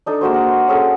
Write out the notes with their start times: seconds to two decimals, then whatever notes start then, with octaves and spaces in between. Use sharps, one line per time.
0.06 D4 D#4 A4
0.21 G#3 A#3 F#4 C5
0.34 A#4 F#5
0.47 C6
0.68 C#4 G#4 A4 F#5